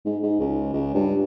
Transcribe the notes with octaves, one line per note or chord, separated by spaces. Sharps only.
G#2
G#2
C#2
C#2
G2